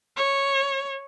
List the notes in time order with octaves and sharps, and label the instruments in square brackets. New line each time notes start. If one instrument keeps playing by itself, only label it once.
[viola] C#5